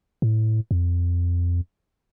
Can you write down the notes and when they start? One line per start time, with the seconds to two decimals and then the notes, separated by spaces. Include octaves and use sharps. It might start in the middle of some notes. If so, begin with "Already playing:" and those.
0.22 A2
0.71 F2